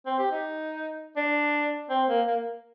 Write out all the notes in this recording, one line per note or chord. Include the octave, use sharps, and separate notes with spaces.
C4
G4
D#4
D4
C4
A#3
A#3